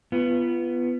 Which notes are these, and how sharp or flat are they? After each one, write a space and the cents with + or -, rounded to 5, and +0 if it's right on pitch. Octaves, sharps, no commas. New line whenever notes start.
B3 +0 F4 -30